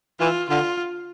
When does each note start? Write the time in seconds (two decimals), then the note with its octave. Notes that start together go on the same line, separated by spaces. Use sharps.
0.19 E3 F4
0.48 D3 F4